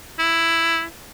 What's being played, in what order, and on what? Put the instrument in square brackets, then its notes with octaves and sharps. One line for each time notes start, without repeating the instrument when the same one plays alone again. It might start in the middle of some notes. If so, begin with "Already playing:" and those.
[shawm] E4